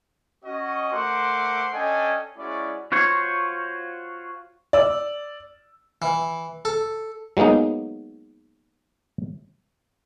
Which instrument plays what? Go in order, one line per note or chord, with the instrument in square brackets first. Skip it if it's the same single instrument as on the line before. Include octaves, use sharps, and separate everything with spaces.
[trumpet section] C#4 F#4 D#5
A3 A#4 C5 F#5 C6 D6
C#4 D4 A4 D#5 G5 G#5
G#3 C#4 E4 F#4 D5
[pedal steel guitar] F4 F#4 C5 C#5
[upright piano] D5 E6
[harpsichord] E3
A4
[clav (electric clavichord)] F#3 G#3 A#3 B3 D#4